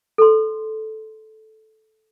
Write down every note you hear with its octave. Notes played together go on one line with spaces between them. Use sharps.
A4 C6